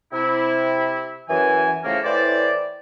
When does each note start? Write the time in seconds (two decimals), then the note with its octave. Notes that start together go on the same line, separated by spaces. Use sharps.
0.11 C3 E4
1.28 F#2 E3 G#5
1.83 A2 C#3 F3 A3 A#3
2.04 A2 E3 C5 D5